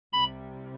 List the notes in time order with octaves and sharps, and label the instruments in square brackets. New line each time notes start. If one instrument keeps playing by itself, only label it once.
[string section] C2 C3 G3 [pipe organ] B5